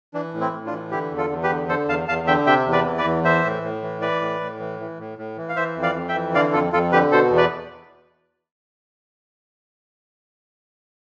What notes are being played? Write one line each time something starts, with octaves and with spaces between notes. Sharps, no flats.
E3 D4
A2
C4 E4
A2
D4 F4
E3
D3 E4 G4
E2
F4 A4
E2
G4 B4
D3
D3 A4 C5
E2 F5 A5
E2 F5 A5
D3 E5 G5
C3 E5 G5
E2
B4 D5
E3
B4 D5
E2
E3 C5 E5
A2
A2
E3
E3 B4 D5
A2
A2
E3
E3
A2
A2
E3
F5
E3 C5 E5
F2
D5 F5
F2
E5 G5
E3
D3 D5 F5
F2 F4 A4
F2 F4 A4
D3 G4 B4
B2 A4 C5
E2
B4 D5